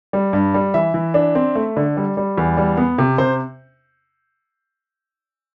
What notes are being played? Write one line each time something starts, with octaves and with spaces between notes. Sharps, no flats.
G3
G2
G3
E3 E5
E3
D4
C4
A3
D3
G3
G3
E2
G3
B3
C3
C3 C5